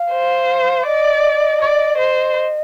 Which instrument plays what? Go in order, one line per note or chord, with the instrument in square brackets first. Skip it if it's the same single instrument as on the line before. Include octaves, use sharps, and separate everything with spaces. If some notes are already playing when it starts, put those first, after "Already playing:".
Already playing: [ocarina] F5
[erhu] C5
[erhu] D5 [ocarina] D#5
[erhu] D5
C5